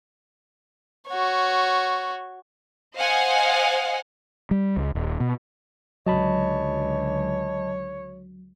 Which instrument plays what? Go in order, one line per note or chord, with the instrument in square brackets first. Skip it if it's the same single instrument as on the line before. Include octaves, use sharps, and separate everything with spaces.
[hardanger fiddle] F#4 C#5
[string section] C5 D#5 F5 F#5 G#5
[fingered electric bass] G3
C#2
D#1
B2
[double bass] C#2 D3 [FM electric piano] F#3 [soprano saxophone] C#5 [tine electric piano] D#5 A5 B5